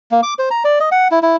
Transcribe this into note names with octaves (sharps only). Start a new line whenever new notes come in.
A#3
D6
C5
A#5
D5
D#5
F#5
E4
E4